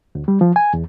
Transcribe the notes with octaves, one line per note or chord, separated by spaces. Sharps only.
D2
G3
F3
G#5
E2